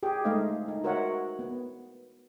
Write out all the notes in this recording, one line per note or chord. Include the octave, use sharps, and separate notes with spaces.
G4 G#4 G5
G#3 A3 D#4 C5 D#5 F5
D#4
F#4 A#4 C5 C#5 E5 F#5
B3